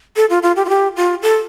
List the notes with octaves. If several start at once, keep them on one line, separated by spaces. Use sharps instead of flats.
A4
F4
F4
G4
F4
G4
F4
A4